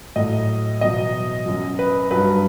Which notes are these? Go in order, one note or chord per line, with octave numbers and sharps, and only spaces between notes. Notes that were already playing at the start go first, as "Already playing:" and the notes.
A2 F#3 D#5
E2 B2 F#3 D#5
F#2 F#3
B4
G2 F#3 B4